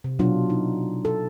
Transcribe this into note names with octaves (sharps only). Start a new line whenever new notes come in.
C3
B2 F#3 D4 F4
D#4
A4